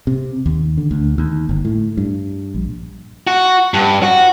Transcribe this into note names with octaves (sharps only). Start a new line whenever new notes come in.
C3
D#2
D3
D2
D#2
G1
A2
G2
A#1
F#4
G2
F#4